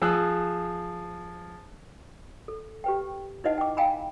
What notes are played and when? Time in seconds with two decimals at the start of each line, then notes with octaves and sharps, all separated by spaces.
0.02 F3 G#4 E6 F#6
2.48 A4
2.84 G4 B4 G5
3.44 D#4 E4 B4 D#5 F#5 A5
3.58 G5 A5 D6
3.77 D#5 F5 G5 G#5 A#5 B5